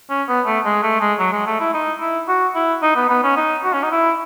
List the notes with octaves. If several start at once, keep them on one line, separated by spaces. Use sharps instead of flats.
C#4
B3
A3
G#3
A3
G#3
F#3
G#3
A3
E4
D#4
E4
F#4
E4
D#4
B3
B3
C#4
D#4
F#4
C#4
D#4
E4